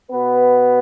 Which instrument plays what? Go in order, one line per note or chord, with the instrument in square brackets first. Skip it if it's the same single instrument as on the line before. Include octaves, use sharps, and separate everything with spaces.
[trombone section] B2 B3 B4